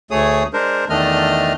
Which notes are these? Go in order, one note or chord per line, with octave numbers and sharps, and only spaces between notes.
D2 A3 G#4 C#5 D#6
G#3 D4 A#4 C5
E2 D#3 A3 D4 D#5 F6